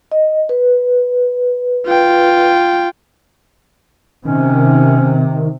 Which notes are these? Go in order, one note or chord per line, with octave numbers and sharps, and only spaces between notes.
D#5
B4
F4 G5
C3 D#3 C#4